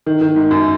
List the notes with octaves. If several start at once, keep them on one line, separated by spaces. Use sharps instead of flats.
D#3
D#3
G#2
F#2